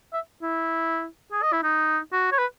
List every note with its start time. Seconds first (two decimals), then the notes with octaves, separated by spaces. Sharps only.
0.13 E5
0.42 E4
1.32 G#4
1.42 D#5
1.52 E4
1.63 D#4
2.12 F#4
2.32 C#5
2.39 B4